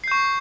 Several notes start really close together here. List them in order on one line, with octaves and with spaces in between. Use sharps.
C7 G6 C#6